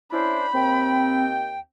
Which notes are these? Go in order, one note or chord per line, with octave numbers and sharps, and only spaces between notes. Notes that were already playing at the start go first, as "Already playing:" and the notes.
C#4 D4 E4 C5 B5
D#2 C4 G5